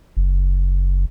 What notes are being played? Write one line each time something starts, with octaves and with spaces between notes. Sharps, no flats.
F#1